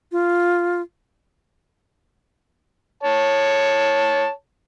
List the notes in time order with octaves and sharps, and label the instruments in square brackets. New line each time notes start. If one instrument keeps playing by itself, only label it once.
[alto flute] F4
[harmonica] C#5 A5